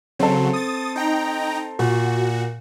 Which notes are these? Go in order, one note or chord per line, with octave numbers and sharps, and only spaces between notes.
C#3 F#3 C4 A4
D#6 A6
D#4 G5 A#5
A#2 F#4